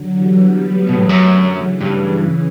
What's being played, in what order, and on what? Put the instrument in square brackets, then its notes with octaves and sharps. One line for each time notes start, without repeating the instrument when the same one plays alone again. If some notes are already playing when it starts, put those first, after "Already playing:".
Already playing: [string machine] D3 F#3
E3 G3
G3 B3
F#3 A3
[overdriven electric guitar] B2
[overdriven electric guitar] A2 [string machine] F#3 A3
[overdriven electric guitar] E2
F#2
[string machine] D3 F#3
C#3 E3
[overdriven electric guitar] G2 [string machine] C#3